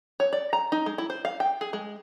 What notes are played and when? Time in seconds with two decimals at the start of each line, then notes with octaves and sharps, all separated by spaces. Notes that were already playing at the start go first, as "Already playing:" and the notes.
0.20 C#5
0.33 D5
0.53 A#5
0.72 D#4
0.86 G#3
0.98 E4
1.10 C5
1.25 F5
1.40 G5
1.61 G#4
1.73 G#3